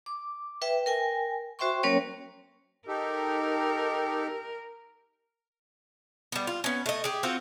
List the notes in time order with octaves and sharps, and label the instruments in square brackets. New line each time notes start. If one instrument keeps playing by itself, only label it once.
[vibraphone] D6
B4 E5 G5
A#4 G5 G#5
F#4 C5 E5 G5 C6 C#6
F#3 A#3 C#4 A#4 C#5 G5
[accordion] D#4 G4 A4 [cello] A#4
[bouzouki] G3 B3
F4
B3 C#4
A3 D#5
G4 G#4
C4 F4 F#4